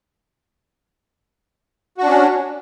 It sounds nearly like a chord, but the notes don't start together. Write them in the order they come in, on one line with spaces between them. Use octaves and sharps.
F#4 D4 C#4